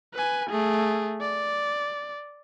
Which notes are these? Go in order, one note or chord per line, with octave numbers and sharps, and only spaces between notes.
B4 G#5
A3 G#4
D5